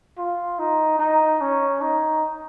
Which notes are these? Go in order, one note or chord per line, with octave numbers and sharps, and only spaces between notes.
F4
D#4
D#4
C#4
D#4